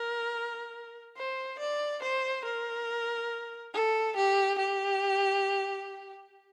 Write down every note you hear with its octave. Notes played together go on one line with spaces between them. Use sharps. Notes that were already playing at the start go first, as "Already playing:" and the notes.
Already playing: A#4
C5
D5
C5
A#4
A4
G4
G4